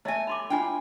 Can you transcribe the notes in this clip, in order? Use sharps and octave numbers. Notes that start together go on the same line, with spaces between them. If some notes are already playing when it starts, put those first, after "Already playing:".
A3 C#5 D#5 E5 G#5
B5 C6 D6
D4 E4 F4 G5 G#5